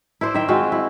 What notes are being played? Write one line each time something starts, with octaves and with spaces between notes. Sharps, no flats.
E4 C5 D5
D#3 E5 G5
G#3 C4 F4 F#4
E4